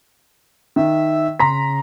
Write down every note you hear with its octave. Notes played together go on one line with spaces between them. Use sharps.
D#3 E5
C#3 A#5 C6 B6